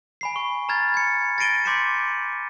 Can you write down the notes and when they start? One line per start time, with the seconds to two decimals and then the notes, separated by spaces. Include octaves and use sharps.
0.21 G#5 B5 C7
0.36 C#6
0.69 A#5 B5 F6 G#6 A6
0.94 G#6 C#7
1.38 A6 A#6 C7 D7 D#7 G7
1.65 C6 D6 G6 B6 C#7 E7